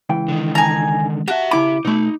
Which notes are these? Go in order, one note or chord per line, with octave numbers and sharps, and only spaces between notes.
C#2 E3 G5
D3 D#3
G#5 A#5
F#4 G4 E5
C#3 E4 B5 D6
B2 A3 D#4 B5